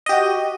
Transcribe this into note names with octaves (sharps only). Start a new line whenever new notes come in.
F#4 G4 D#5